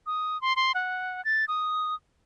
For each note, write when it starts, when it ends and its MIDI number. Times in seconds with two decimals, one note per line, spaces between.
0.06 0.40 87
0.41 0.56 84
0.56 0.72 84
0.75 1.23 78
1.25 1.45 93
1.48 1.95 87